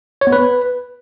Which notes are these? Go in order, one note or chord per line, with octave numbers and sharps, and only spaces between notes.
C#5
B3
B4